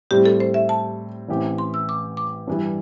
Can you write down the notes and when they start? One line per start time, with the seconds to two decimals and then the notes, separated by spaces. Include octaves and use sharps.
0.11 A2 G3 C4 G4
0.26 A4
0.40 C5
0.54 E5
0.69 A5
1.29 A1 A2 E3 C4 G4
1.58 C6
1.74 E6
1.89 D6
2.17 D6
2.47 G2 E3 G3